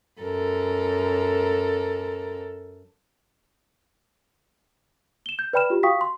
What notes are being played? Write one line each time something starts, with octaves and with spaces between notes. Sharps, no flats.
F#2 A4 A#4
E7 G7
G6
B4 D5 G5 B5 F6 E7
F4 G4
F#4 F5 G5 C#6 D#6 B6
C6